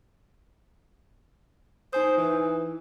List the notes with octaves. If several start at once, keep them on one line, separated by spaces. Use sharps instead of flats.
D#4 C5 G#5 D#6
E3